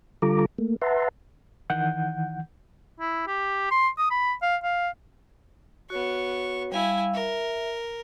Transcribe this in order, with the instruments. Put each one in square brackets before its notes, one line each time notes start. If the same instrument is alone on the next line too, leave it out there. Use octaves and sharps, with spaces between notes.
[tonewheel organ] D3 G3 F4 A4 A#5 D6
A3 A#3
B4 E5 F#5 A5 A#5 C6
[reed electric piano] D#3 E3 F#5 G6
[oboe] E4
G4
C6
D#6
B5
F5
F5
[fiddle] B3 C#6 [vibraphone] F#4 C#5
[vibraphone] G3 F5 E6 [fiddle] E4 G#5
[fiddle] A#4 [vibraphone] E5